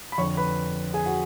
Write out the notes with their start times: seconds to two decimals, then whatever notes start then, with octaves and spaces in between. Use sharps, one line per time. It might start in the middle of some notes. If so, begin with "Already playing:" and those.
0.12 B5
0.18 F2 D3 C#5 C#6
0.37 B4 B5
0.94 G#4 G#5
1.06 F#4 F#5